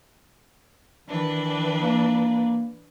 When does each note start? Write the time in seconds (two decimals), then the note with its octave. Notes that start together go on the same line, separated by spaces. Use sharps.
1.08 D#3 E3 D4 B4
1.82 A#3